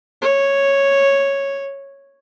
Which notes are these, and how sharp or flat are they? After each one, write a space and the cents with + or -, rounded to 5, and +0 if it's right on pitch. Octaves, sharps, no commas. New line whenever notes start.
C#5 -5